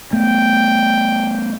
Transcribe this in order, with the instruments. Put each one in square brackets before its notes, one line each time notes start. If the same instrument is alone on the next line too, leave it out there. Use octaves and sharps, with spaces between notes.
[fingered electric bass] A3 B3 [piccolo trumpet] G5